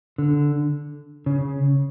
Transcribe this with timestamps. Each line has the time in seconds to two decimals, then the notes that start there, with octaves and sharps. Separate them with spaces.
0.18 D3
1.26 C#3